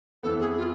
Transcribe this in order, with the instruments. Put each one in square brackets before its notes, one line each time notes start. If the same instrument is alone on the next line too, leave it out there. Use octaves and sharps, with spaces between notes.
[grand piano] F2 E3 B3 [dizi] A4
[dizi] G#4
F4